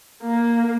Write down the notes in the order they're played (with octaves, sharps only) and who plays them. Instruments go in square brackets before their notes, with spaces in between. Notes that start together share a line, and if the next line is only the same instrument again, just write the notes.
[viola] A#3